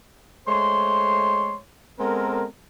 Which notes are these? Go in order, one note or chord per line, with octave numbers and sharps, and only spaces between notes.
G#3 A3 C5 C#5 C6
G#3 B3 C4 A4 A#4